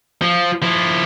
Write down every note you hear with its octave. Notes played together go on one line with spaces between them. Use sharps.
F3
F3 E4